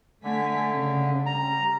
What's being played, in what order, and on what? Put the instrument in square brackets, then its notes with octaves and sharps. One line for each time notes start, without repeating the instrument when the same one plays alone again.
[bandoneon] D3 [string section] A3 G#5 B6
[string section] C#3
[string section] G3 [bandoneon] A#5